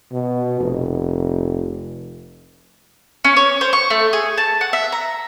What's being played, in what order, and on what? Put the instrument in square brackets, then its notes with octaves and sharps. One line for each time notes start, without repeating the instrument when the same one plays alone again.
[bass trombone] B2
F1
[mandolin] C#4
C#5
C5
C#6
A3
G#4
A5
F#5
E5
A#5